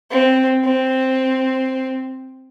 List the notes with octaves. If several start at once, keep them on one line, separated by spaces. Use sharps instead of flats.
C4
C4